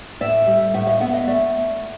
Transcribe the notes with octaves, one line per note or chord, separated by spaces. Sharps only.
A2 D5 E5
G3
A2 E5 F#5
D#5 F5
B3 E5 F#5
D#5 F5
A3 D5 E5